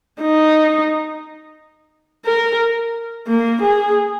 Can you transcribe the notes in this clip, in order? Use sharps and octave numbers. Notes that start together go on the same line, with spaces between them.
D#4
A#4
A#3
G#4